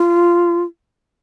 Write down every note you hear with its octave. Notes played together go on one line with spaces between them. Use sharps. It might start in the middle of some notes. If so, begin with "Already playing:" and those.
Already playing: F4